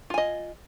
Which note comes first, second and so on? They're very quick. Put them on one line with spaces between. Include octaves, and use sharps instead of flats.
F4 G#5 D#5